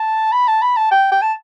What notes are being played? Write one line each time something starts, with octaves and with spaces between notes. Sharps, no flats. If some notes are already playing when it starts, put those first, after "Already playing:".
Already playing: A5
B5
A5
B5
A5
G5
G5
A5